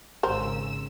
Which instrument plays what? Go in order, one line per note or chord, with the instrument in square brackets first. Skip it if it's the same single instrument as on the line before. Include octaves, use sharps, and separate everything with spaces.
[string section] G#1 C#3 E6 [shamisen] A#4 C5